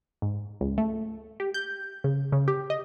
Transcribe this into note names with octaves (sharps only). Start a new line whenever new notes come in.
G#2
C#2
A3
G4
G6
C#3
C#3
G4
D#5